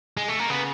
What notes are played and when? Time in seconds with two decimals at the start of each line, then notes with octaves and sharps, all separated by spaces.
0.17 G#3
0.28 A3
0.39 A#3
0.50 C#3 B3